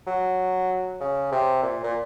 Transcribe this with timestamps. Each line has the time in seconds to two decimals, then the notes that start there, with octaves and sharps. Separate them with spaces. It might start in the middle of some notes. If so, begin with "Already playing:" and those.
0.07 F#3
1.01 C#3
1.32 C3
1.63 A#2
1.84 A#2